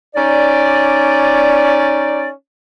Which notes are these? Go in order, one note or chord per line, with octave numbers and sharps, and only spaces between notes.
C#4 D#4 D5